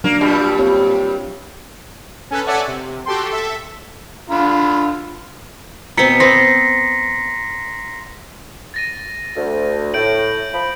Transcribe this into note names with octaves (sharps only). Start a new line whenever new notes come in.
F#3 A#3 D4
G2 A#2 G3
C4 G4 C#5
C#4 A4 B4
A4 C#5 D5 E5 F#5 G#5
C3
F#4 G4 A4 G5 C6
A4 E5
D3 F4 B5
B2 C4 A#5 B6 C#7
B3 C4 C6 A#6 C7
A6 A#6 D#7
D2
A2 G6 D7 F#7
F3 B5